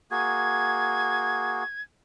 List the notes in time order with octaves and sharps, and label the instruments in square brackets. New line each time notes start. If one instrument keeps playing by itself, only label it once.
[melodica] A#3 F#4 G#4 [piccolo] G#6